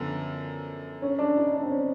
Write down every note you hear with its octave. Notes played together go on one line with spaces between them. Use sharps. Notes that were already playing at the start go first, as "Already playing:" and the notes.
Already playing: F#2 D3 F3 B3
C#4
D4
D#4
D4
C4
C#4